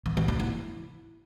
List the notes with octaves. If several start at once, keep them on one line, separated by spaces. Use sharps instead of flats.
E3
E3
D4
E4